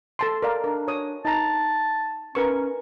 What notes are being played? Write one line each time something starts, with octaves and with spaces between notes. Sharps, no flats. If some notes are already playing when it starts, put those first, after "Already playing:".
A4 A5 C6
A#4 D5 F5
D4 A#4
C#5 D#6
D#4 A5 A#5
C#4 A#4 B4 C#6